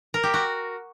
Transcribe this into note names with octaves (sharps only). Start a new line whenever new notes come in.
A#4
G4
F#4